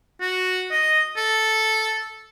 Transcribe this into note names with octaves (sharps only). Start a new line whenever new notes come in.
F#4
D#5
A4